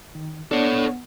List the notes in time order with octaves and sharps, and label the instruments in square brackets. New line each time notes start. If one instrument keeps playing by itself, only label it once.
[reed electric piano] D#3
[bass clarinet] B3 [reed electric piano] D4 [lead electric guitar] A4 C#5